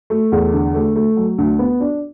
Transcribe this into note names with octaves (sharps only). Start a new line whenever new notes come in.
A3
E2
D3
A3
A3
F#3
D2
B3
D4